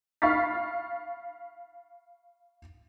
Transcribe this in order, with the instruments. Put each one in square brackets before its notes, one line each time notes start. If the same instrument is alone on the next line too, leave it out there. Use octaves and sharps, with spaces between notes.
[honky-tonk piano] F5 B5 C#6 F6 A6 B6